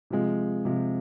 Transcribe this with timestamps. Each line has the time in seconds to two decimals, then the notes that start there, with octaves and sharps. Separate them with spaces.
0.10 C3 F3 G#3
0.65 C3 F3 G#3